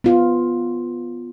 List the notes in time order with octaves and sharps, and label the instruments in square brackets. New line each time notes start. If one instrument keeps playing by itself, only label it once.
[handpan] B3 F4